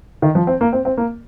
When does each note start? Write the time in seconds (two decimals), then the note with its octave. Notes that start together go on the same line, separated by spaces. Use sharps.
0.22 D#3
0.35 F3
0.47 C4
0.61 A#3
0.73 C4
0.85 C4
0.98 A#3